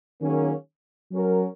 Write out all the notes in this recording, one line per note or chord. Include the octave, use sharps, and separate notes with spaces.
D#3 F#3 A#3 C#4 G#4
F#3 C#4 F#4 A#4